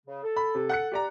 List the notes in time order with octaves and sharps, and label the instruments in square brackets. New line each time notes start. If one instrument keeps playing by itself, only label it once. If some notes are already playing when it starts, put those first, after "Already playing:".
[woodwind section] C#3
A4
[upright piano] B5
C3
F#5 F#6 C#7
G4 D5 A#5